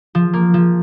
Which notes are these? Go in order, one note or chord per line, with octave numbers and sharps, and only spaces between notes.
F3
A#3
F3